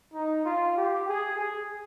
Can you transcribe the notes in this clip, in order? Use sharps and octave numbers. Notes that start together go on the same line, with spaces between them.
D#4
F4
G4
G#4
G#4